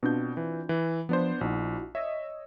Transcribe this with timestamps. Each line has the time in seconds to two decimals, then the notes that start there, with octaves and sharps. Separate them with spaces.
0.03 B2 C4 D4 F4 G6
0.37 E3
0.69 E3
1.09 F3 B3 D4 C5
1.41 A#1 D#4 E4 F#4
1.95 C#5 D#5 E5 E6